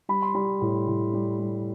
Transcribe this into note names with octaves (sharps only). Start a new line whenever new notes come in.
G3 B5
C6
G3 B5
A2
A2
G3
G3